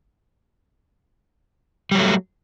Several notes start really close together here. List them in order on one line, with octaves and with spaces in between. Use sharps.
G3 F#3 A3